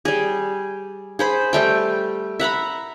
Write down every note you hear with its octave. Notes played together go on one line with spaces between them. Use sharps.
G3 G#4
G#4 C5 B5
G3 A3 G5
E5 F#5 A#5 B5